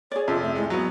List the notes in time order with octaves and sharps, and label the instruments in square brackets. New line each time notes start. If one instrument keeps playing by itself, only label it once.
[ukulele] G#4 D5 [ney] C#5
[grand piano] F2 C3 [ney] F4
[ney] A3
[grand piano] A2 [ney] G#3
[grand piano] F#3 B3 [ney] F#4